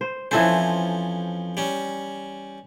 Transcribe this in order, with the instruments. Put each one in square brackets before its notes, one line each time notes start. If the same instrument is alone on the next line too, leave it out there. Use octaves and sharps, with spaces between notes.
[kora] C5
[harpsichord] F2 F3 C#4 [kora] E3 A4 C5
[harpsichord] G3 C#4